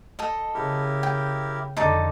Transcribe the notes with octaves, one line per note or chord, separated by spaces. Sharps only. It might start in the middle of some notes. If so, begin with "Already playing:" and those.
A4 D#5
C#3 E4 G4 A#4
G5
F2 D3 D#4 A4 D6